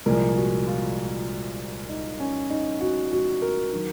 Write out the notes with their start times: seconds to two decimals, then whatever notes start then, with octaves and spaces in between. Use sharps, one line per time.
0.06 C2 A#2 F3 G#3 A#4
0.36 F#4
0.67 F4
1.89 D#4
2.20 C#4
2.50 D#4
2.81 F#4
3.11 F#4
3.42 A#4
3.73 D#3 F#3